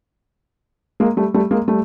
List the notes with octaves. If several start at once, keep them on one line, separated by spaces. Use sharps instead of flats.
G#3 A#3
G3 A3
G3 A3
G#3 A#3
G3 A3